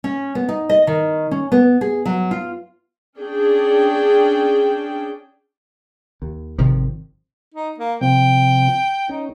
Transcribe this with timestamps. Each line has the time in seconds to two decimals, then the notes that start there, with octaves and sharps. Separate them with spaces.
0.04 C#4
0.35 B3
0.49 D#4
0.69 D#5
0.87 D#3
1.31 C#4
1.52 B3
1.81 G#4
2.05 F#3
2.31 F4
3.18 C#4 D4 G#4 G5
6.22 D#2
6.58 G#1 C3 D#3 F3
7.55 D#4
7.78 A#3
8.01 C3 F3 C4 G5
9.09 C#4 D#4